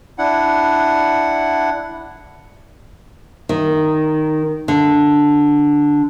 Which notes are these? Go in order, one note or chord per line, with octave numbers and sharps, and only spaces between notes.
D4 E4 F#5
D#3
D3